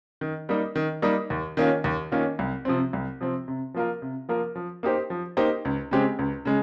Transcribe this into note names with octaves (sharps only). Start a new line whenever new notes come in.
D#3
G3 A#3 D#4
D#3
G3 A#3 D#4
D#2
D#3 A#3 C#4 F4
D#2
D#3 A#3 C#4 F4
C2
C3 F3 C4
C2
C3 F3 C4
C3
F3 A#3 F4 A#4
C3
F3 A#3 F4 A#4
F3
A#3 D#4 G4 C5
F3
A#3 D#4 G4 C5
C#2
C#3 G#3 C4 G4
C#2
C#3 G#3